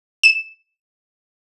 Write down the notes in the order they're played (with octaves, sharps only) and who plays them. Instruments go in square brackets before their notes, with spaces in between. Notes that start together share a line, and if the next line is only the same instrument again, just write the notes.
[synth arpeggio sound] E7